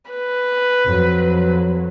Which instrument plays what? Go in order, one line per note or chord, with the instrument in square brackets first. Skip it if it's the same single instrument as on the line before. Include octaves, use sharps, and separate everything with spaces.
[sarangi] B4
[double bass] F2 F#3